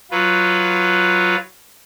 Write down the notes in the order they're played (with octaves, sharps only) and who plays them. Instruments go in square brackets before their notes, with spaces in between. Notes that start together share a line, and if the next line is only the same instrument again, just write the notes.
[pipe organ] F#3 F4 B4